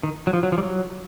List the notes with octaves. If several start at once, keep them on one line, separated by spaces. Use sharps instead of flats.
D#3
F#3
F3
F#3
F3
G3
F#3